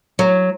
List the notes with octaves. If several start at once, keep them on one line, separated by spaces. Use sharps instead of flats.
F#3